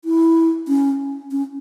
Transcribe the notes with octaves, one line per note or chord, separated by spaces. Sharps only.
E4
C#4
C#4